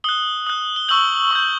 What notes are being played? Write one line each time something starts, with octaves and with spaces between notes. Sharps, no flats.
D#6 F#6 G7
D#6 F#6
G7
C#6 E6 G6 F#7
C#6 E6 G6